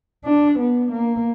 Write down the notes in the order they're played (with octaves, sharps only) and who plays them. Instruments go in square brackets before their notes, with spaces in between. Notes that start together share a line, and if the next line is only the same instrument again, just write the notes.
[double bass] D4
B3
A#3